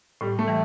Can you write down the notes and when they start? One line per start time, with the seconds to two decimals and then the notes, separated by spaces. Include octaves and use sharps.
0.21 A2 G3
0.39 A3
0.48 E3 G3